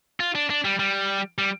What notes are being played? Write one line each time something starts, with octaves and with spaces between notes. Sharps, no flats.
F4
D4
D4
G3
G3
G3